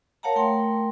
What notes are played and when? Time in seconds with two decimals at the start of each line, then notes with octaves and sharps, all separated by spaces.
0.23 A#4 C#5 F5 F#5 A5 A#5
0.36 A3 A#4 G5 C6